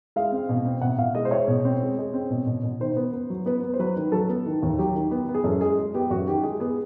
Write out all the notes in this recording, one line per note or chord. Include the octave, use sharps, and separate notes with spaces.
G#3 F5
C4
B2
C4
B2 F#5
B2 F5
G#3 D#5
C5
G#3 C#5
B2
C4
G#3
G#3
C4
B2
B2
B2
D#3 C5
B3
B3
F#3
B3 B4
B3
C5
F#3 B4
D#3
F#3 A4
B3
D#3
D#2
F#3 G4
D#3
B3
B3
G#4
F#2 A4
G#3 G#4
G#3
B3 G4
F#2 F#4
D#3 G4
G#3 G#4
B3 G#4